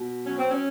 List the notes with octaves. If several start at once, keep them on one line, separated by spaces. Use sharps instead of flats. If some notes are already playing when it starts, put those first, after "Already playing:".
Already playing: B2
F#3 C#4
C4
C#4